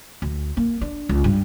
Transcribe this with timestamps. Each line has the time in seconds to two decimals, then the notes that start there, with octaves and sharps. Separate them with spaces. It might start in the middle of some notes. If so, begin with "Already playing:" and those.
0.22 D2
0.57 A#3
0.81 D4
1.09 C#2
1.24 G2